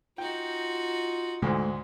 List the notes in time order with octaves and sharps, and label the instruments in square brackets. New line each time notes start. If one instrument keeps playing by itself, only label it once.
[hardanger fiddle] D#4 F#4 [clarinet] F4 [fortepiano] G5
[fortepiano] D2 G#2 [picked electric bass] G#3 A3